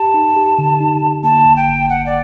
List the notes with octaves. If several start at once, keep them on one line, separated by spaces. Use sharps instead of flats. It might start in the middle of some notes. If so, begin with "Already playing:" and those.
Already playing: G4 A5
D#4
G4
D3
D#4
D3
A#3 A5
G1
G5
G1
G1 F#5
D5